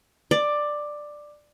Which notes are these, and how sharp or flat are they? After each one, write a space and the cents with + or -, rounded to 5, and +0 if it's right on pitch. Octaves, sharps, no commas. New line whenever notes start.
D5 +10